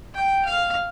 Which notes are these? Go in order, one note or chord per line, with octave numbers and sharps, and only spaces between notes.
G5
F5